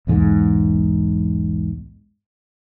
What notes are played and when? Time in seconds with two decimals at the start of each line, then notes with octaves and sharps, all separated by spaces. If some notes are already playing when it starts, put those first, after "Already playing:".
0.07 B1 E2 G#2 G#3